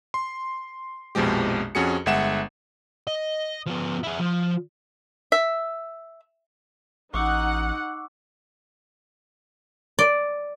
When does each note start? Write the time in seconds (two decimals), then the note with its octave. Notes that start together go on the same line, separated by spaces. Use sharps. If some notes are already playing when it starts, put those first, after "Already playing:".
0.14 C6
1.15 A#1 F2 B2 F3 G#3 G4
1.75 F2 C#4 F#4 G#4 C#7
2.06 G1 G#3 E5 F#5 E7
3.07 D#5
3.66 F3 B3
4.03 E4 G#4
4.20 F3
5.32 E5
7.14 A1 D#4 F#5 C#6 D6 E6
9.99 D5